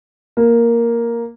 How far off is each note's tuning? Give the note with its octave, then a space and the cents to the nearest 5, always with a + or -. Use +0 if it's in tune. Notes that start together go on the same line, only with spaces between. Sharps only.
A#3 +0